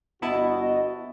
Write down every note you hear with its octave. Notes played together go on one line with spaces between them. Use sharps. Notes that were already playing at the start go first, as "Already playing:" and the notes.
G1 B3 E4 F#4 D#5 A5